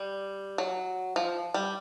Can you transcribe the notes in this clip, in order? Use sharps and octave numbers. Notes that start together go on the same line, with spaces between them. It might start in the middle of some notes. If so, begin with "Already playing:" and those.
Already playing: G3
F#3
F3
G3